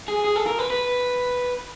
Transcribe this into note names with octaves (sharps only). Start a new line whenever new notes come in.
G#4
G#4
A4
A#4
B4
B4